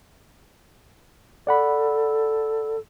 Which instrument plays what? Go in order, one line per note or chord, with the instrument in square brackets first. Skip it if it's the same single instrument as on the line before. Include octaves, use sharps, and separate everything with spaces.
[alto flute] A4 [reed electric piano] D5 F#5 B5